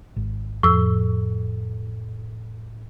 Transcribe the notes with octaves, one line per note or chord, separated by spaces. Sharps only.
G#1
F2 A2 E6